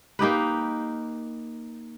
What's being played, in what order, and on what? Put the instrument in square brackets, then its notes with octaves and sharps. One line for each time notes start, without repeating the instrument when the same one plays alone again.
[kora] A#3 D#4 G4 B4